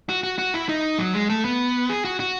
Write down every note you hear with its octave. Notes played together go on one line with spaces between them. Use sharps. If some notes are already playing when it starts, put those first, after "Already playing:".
F#4
F#4
F#4
E4
D#4
F#3
G#3
A3
B3
G#4
F#4
F#4